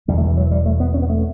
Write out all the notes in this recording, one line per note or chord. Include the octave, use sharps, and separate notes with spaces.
E1 E2 B2 G3
A3
E3
F#3
G3
A3
B3
C#4
B3
A3